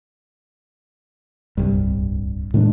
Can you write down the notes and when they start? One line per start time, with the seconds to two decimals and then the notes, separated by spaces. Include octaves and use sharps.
1.57 D1 C2 G2
2.54 A2 D#3 G#3 D4